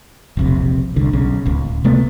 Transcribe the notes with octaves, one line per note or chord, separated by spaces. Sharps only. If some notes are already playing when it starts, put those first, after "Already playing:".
E1 A#1 C3
C2 D3
B1 C#3
D1 C#2
C3 G#3 A3 B3